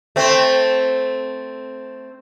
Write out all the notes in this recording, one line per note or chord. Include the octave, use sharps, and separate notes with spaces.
A3 C4